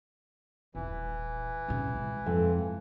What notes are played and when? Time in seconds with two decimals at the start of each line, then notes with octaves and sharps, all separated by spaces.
0.75 D#1 A#1 E3
1.68 A#2 C#3
1.94 C3 G#3
2.26 F2